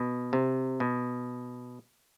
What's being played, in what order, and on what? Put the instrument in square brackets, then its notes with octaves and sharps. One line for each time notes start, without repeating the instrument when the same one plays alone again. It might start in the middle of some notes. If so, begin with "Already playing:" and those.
Already playing: [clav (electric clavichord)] B2
C3
B2